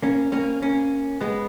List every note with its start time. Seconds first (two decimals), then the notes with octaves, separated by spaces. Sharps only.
0.02 A#3 C#4
0.32 A#3 C#4
0.62 A#3 C#4
1.21 G#3 B3